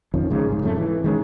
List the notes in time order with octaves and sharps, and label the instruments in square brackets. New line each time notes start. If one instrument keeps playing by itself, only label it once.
[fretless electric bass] F2 D#3 F3 C#4
C#2 G#2 C#3
C2 G#2
D1 F2 C#3 A3
E3
D#3 G#3 C#4